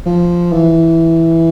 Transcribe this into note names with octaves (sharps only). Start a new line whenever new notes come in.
F3
E3